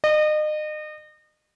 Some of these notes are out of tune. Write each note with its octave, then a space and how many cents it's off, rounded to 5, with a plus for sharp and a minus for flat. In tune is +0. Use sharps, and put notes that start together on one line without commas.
D#5 -35